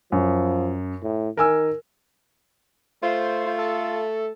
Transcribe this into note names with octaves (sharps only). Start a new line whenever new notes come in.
F#2 F3
A2
D#3 A#4 G#5 E6
A3 F4 C5
F4
A4